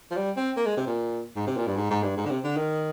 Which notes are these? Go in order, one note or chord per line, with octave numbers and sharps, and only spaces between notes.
F3
G3
C4
A#3
G#3
C3
A#2
G#2
C3
A#2
G2
G#2
G#2
G2
G#2
D3
C3
D3
D#3